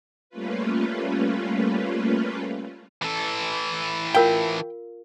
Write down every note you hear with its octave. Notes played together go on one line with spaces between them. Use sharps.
G3 A3 A#3 C#4 F4 B4
E3 A4
F4 A#4 F5 G5